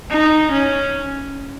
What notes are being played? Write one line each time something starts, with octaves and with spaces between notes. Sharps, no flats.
D#4
C#4